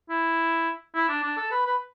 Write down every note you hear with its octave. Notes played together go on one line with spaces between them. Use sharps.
E4
E4
D4
D4
A4
B4
B4